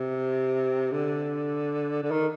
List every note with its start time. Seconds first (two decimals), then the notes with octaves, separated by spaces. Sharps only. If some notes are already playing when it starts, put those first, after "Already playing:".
Already playing: C3
0.91 D3
2.03 D3
2.11 D#3